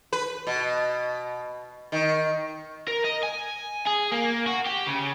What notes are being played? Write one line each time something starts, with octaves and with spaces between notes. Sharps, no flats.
B4
B2
D#3
A#4
D#5
G#5
G#4
A#3
F#4
G4
C#3